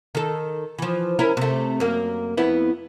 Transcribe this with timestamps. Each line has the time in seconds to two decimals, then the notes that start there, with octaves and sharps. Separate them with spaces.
0.15 D#3 A4
0.79 E3 F3
1.19 C#4 E4 A#4
1.37 C3 A3
1.80 F#2 A#3
2.37 F2 B3 E4